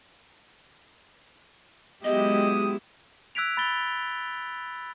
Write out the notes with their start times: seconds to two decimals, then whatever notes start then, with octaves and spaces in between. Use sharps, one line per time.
2.04 F#3 G#3 B3 E4 G4 D#5 D#6
3.35 E6 F#6 G#6 B6 D7 F7
3.57 B5 A6 G7